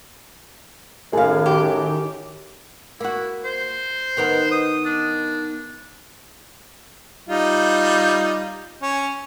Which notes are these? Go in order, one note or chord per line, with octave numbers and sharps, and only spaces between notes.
F#2 A2 D#3 G#4 F5
G4
A#3 E4 F#4
C5
D#3 B3 A#4
D#6
D4
G3 D#4 F4
C#4